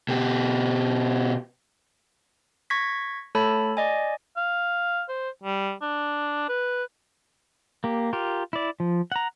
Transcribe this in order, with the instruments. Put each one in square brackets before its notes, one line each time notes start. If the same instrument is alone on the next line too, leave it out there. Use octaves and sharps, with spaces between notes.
[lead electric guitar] B2 G4
[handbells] C#6 G#6 A#6 B6
A3 A4 C#5 A5 B5
D5 D#5 G#5
[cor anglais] F5
C5
G3
D4
B4
[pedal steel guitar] A#3 G4
F4 G4 A#4
E4 D5
F3
F#5 A#5